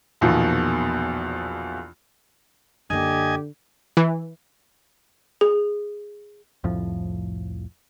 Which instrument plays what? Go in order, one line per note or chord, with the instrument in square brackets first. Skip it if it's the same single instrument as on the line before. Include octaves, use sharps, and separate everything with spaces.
[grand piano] A#1 E2 B2 D#3 F3
[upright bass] F#2 A#3 [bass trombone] D3 [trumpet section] G4 [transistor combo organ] D#5 G#5
[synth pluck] E3
[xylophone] G#4
[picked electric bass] C2 F2 A2 F3